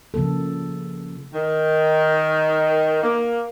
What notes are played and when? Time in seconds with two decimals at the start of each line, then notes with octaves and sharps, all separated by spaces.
0.14 C#3 F3 A#3 A4
1.34 D#3
3.03 A#3